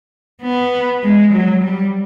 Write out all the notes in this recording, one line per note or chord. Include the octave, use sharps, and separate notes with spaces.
B3
G#3
F#3
G3